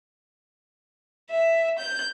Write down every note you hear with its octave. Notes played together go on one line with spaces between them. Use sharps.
E5
G6